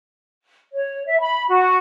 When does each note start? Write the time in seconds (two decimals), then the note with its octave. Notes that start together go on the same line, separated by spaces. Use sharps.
0.73 C#5
1.06 E5
1.20 B5
1.49 F#4